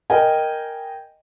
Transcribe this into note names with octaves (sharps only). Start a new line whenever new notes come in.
A#4 D#5 G5 G#5